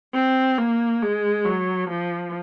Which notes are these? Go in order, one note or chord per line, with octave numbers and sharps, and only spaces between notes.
C4
A#3
G#3
F#3
F3